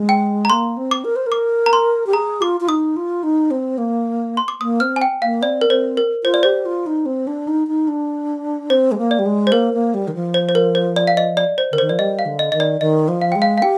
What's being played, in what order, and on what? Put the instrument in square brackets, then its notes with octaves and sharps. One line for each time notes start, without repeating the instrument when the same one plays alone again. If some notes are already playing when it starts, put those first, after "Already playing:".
Already playing: [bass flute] G#3
[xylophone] G5
A#5
[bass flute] A#3 [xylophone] C6
[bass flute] C4
[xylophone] D6
[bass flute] A#4
C5
A#4
[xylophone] D6
A#5
C6
[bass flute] G4
[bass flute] G#4 [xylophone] A#5
[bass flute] F4 [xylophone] D6
[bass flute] F4
[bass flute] D#4 [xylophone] D#6
[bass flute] F4
D#4
C4
A#3
[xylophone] C6
D6
[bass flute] A#3 [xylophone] D#6
[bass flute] C4 [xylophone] F6
[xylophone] G#5
G5
[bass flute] A#3 [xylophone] F5
[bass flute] C4 [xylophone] D5
[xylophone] A#4
[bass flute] C4 [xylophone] C5
[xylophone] A#4
[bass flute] F4 [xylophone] C5
[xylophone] D5
[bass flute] G4 [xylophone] C5
[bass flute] F4
D#4
C4
D4
D#4
D#4
D4
[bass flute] C4 [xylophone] C5
[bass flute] G#3
A#3
[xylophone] D5
[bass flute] G3
G#3
[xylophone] C5
[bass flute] A#3 [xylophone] A#4
[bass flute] A#3
G3
D#3
F3
[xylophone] C5
C5
A#4
C5
D5
F5
D#5
D5
C5
[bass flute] D3 [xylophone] A#4
[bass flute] D#3 [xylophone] C5
[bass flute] F3 [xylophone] D5
[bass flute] G3 [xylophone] D#5
[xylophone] F5
[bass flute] D3
[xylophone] D#5
[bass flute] D#3 [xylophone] D#5
[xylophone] D5
[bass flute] D#3 [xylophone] D#5
[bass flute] F3
[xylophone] F5
[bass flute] G#3 [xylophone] G5
[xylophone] F5
F5
[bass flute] G4 [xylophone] G5